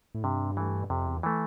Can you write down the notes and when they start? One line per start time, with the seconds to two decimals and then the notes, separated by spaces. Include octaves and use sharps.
0.15 A2
0.23 G2 C3
0.57 E3 A3
0.90 F2 C3
1.07 E2
1.23 E3 A3